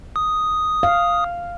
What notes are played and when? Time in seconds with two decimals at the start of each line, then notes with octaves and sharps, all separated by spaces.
0.16 D#6
0.83 F5